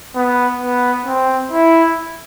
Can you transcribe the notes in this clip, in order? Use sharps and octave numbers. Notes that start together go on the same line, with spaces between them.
B3
B3
C4
E4